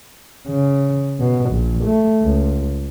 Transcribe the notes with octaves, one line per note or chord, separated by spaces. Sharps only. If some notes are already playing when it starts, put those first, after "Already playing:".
C#3
B2
A#1
A3
C#2